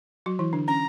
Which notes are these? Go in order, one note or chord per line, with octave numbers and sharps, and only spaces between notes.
F#3 F#4
E3 E4
D3 D4
C#4 A#5